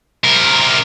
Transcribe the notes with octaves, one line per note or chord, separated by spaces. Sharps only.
C3 A#4